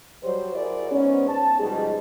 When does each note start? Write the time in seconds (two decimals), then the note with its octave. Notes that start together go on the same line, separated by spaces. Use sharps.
0.23 F#3 G3 C5
0.55 E4 F#4 G#4 A#4 D5
0.92 G#2 B3 C#4
1.29 A5
1.59 B2 F3 G3 G#3 D#4 G#4